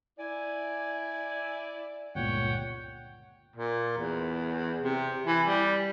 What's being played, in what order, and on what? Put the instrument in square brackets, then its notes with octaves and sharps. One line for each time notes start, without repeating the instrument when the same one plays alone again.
[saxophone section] E4 D5 [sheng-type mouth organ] G#5
[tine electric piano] G1 C#2 A#2 [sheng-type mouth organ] C#5 F#5 G5
[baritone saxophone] A#2
E2
C3
E3
G3